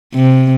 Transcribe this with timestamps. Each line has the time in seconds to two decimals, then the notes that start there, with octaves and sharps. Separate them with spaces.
0.15 C3